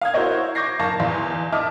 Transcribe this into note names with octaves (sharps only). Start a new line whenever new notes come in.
F5 D#6 G#6
E4 F#4 A#4 C5 C#5 D#5
C#6 D6 G6 G#6 A#6 C7
F#1 F5 A5 C#6 A#6
E2 F5 C6
D#5 E5 A5 D6 D#6 F6